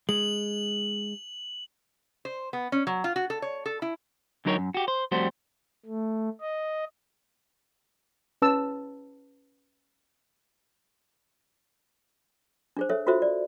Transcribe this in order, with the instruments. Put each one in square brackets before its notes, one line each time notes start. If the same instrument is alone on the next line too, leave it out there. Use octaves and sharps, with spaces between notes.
[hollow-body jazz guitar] G#3 [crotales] F#7
[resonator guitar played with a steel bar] C5
B3
C#4
F#3
F4
F#4
A4
C#5
A4
E4
[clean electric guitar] D3 F#3 D#4 A#4 C#5
F#2
F#4 G4
C5
F2 G3 A3 F#4 C5
[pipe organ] A3
D#5
[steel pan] C#4 B4 A5 E6
[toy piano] D4 G#4 C5
A4 C#5 E5
F4 F#4 A4 C5 E5
D5